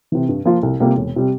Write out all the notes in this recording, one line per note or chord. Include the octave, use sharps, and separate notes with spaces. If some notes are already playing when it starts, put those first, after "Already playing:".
C3 E3
G2
F3 A#3 F4
C2
C3 G3 A#3 F4
E1
C3 G3